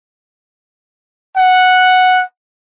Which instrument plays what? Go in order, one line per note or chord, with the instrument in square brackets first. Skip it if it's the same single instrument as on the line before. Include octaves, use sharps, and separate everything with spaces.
[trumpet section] F#5